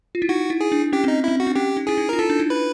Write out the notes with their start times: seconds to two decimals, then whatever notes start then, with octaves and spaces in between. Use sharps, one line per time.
0.15 F4
0.22 E4
0.29 D#4 F#4
0.50 E4
0.61 G#4
0.72 D4
0.93 C#4 G4
1.04 C4 D#4
1.24 C4 E4
1.40 F#4
1.47 D4
1.55 C#4 G4
1.77 D#4
1.87 E4 G#4
1.98 D#4
2.09 F4 A#4
2.19 E4 A4
2.30 D4
2.40 D#4
2.50 B4